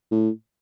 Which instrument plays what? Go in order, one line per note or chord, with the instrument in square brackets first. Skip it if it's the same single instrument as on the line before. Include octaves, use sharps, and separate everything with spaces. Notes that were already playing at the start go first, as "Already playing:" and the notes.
[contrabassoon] A2